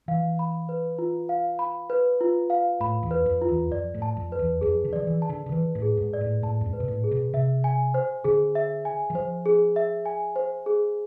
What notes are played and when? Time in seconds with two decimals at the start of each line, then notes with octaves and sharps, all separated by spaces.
0.08 E3 F5
0.39 B5
0.69 B4
0.98 F4
1.29 F5
1.59 B5
1.90 B4
2.21 F4
2.50 F5
2.80 A2 B5
3.03 E2
3.11 B4
3.26 F2
3.41 F4
3.48 E2
3.71 F2 D5
3.94 A2
4.02 A5
4.16 F2
4.32 B4
4.39 E2
4.61 F2 G#4
4.84 D3
4.93 F3 D5
5.07 E3
5.22 A5
5.29 D3
5.46 D3
5.52 E3 B4
5.75 A2
5.82 G#4
5.97 G#2
6.13 D5
6.21 A2
6.43 A2 A5
6.61 F2
6.66 G#2
6.73 B4
6.80 B2
6.88 A2
7.04 G#4
7.12 B2
7.34 C3 E5
7.64 G#5
7.94 C5
8.24 D3 G#4
8.55 E5
8.85 G#5
9.10 E3
9.15 F3 C5
9.46 G#4
9.76 E5
10.06 G#5
10.36 C5
10.66 G#4